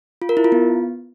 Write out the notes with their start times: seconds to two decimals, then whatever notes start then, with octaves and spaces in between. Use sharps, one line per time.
0.22 F4
0.29 A#4
0.37 E4
0.44 F4
0.52 B3